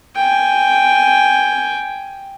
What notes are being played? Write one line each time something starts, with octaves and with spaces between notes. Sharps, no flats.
G5 G#5